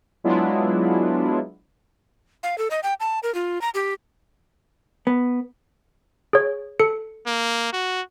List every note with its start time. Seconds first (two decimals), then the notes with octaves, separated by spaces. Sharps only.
0.24 F#3 G#3 B3 D4 E4 F4
2.43 F5
2.58 A4
2.71 D#5
2.83 G5
3.00 A5
3.23 A#4
3.35 F4
3.61 A#5
3.74 G4
5.07 B3
6.33 G#4 C#5
6.80 A4 C#7
7.27 A#3
7.73 F#4